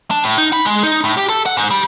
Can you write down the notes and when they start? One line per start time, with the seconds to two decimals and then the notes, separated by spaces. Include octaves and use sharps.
0.11 D4
0.24 A2
0.38 D#4
0.53 B5
0.65 G#3
0.83 D#4
1.05 A2
1.17 G4
1.29 A4
1.46 F#5
1.57 G#2
1.70 G3